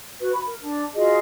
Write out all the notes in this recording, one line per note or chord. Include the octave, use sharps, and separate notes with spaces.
F#4 B4
B5
A#4
D4
F4 F#4 G#4 D#5